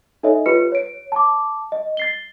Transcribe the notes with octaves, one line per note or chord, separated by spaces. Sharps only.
D#4 A4 C#5 D#5 E5
F4 G4 B4 C#7
C#5 D7
A5 D6
D#5
A6 C7 G7